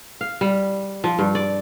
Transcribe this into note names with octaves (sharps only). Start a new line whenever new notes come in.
F5
G3
F3
G2
D5